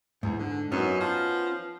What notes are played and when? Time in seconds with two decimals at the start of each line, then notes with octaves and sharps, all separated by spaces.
0.23 E2 G#2
0.39 D3
0.71 F#2 B3 C#4 D#4
1.00 F3